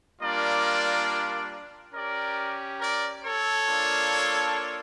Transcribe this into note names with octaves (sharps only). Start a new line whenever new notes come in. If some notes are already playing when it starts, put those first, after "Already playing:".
G3 A#3 D4 F4 A#4 D5
C#4 G4 A#4 D5
A#4 D5
A4 C#5
A#3 D4 F4